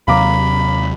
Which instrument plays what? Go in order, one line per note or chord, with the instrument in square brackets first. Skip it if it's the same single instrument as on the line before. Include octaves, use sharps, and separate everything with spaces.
[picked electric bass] D#2 C3 F#3 [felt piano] F5 A#5 D6 [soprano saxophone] B5